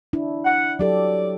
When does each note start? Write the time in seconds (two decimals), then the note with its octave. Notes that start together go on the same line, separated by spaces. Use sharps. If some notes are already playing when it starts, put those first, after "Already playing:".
0.13 D4 E4
0.45 F#5
0.79 F#3 G4 A4 D5